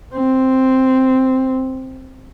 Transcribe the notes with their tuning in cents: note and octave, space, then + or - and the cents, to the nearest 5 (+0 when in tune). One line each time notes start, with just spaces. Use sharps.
C4 +0